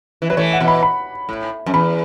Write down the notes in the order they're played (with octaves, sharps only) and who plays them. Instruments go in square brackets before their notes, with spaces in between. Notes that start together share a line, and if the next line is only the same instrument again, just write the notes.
[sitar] E3
[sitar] F#3 [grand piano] B4
[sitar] E3 A3 [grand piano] C#5
[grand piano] F#5
[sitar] B2 E3
[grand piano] B5
B5
[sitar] A2
F#2
[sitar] E2 [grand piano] B5